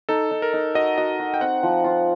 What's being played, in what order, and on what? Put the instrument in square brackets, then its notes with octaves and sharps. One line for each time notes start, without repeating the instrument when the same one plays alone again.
[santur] D#4 [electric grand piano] A4
[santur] D#4
[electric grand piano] A#4
[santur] D#4
[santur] F#4 [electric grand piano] D#5
[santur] F#4 [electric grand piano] D#5
[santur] F#4
[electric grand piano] G5
[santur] C4 [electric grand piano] F#5
[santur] F3
F4